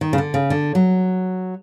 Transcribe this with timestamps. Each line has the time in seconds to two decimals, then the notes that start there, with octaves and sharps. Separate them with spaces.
0.01 D#3
0.13 C#3
0.18 D3
0.34 C#3
0.50 D3
0.75 F#3